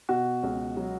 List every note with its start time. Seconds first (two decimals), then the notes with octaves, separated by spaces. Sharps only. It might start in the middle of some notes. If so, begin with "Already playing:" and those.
0.09 B2 F#4
0.43 C#2
0.77 F#3